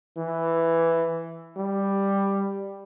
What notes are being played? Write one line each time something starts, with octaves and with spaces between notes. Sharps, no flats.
E3
G3